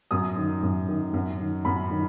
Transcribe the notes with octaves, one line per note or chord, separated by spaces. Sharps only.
F#2 D#6
D#3
F#2
D#3
F#2
D#3
F#2 B5
D#3